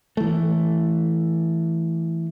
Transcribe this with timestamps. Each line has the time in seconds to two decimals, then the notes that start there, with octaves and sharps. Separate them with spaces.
0.17 E3 A3